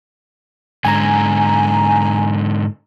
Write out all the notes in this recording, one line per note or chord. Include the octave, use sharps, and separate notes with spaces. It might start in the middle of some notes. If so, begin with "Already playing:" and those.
G#2 D3 G#5 A#5